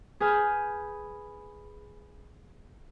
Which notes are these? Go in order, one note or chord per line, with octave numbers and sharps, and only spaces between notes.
G#4 B4 G#5 F6 G6